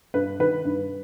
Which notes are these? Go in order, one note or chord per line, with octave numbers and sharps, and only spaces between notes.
G2 B4
D#3 B4
G2